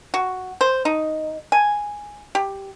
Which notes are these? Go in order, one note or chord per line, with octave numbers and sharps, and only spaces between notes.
F#4
C5
D#4
G#5
G4